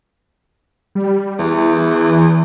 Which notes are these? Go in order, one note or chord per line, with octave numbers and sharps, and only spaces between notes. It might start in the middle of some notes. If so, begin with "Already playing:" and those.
G3
E2 E3